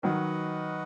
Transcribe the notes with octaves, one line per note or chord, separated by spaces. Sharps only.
D#3 F#3 F#4 B4 D#5 F#5